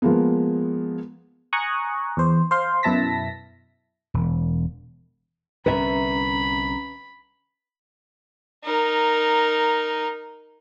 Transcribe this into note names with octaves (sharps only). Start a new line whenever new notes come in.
F3 G#3 A#3 B3
G#5 A#5 C#6 D#6 F#6
E2 C5
C5 F5 C6
F#2 B2 E4 A5 A#6 B6
E1
C2 D3 C#4 B4 E5 A#5 B5
D#4 A#4